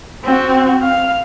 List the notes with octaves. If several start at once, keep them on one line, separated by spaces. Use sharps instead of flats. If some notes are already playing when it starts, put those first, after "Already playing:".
C4 F#4
F5